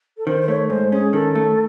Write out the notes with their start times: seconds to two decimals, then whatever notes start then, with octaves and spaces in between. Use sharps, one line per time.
0.17 A4
0.26 D#3 C5
0.41 C5
0.48 A3 C#5
0.69 G#2 C5
0.92 C#4 G#4
1.13 D#3 A4
1.35 A3